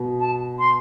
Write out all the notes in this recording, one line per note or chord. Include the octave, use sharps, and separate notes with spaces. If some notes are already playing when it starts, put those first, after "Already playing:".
Already playing: B2
A5
C6